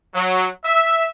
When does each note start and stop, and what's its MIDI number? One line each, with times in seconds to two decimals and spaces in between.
0.15 0.47 54
0.64 1.05 76